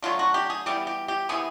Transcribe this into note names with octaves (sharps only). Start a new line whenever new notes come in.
D3 F#3 A3 F4
F#4
G4
G#4
E3 G3 B3 G4
G4
G4
C3 E3 G#3 B3 G#4